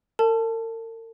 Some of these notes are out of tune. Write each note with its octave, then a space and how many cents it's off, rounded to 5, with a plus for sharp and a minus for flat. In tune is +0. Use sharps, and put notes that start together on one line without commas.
A#4 -45 A5 +0